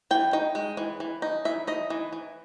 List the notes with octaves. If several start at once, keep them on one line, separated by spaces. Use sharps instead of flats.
E3 G5
D#4 G5
G#3
E3
E3
D#4
E3 E5
D#4 D#5
E3
E3